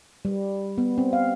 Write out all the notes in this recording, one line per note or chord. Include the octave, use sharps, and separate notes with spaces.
G3
B3
C4
F5